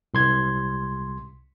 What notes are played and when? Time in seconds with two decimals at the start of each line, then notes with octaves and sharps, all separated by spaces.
0.14 C2 C6 G#6